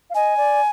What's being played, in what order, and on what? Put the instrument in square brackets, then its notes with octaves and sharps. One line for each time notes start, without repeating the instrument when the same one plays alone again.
[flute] F5
[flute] D#5 [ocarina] G#5
[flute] D5